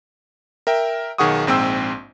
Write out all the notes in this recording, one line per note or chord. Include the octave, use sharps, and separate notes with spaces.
A#4 E5 G5
B1 D#3 G#4 F#5 C#6 D#6
A#1 G#2 C4 C5 G5 E6